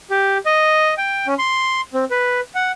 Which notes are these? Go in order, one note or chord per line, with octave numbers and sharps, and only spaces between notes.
G4
D#5
G5
C#4
C6
C4
B4
F#5